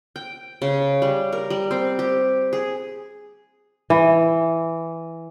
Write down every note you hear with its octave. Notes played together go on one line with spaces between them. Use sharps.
G5
C#3
G3
A#4
G3
C4
G4
G#4
E3